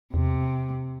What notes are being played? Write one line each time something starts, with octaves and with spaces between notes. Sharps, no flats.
E2 C3